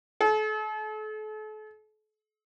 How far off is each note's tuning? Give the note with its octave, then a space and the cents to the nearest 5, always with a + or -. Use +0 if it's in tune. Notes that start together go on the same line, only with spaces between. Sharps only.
A4 -40